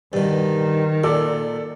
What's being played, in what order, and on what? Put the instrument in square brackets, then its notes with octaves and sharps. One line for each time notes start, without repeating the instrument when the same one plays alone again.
[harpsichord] G2 B2 [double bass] D#3
[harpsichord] A#2 [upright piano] A4 D5